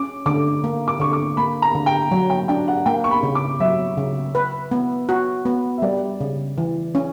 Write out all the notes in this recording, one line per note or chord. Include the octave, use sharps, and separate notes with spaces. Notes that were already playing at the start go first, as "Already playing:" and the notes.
Already playing: C#4 D6
D3 D6
A#3
D6
D3 C#6
D6
A#3 B5
A#5
D3
G5
F#3
G5
D4 G5
F#5
A#3 G5
C#6
B5
C#3
D6
F#3 E5
C#3
B4
B3
F#4
B3
E5
G3 D5
C#3
E3
C#4